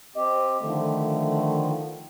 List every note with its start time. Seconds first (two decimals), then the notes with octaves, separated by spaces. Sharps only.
0.16 C4 G4 D#5
0.62 D3 D#3 F3 A3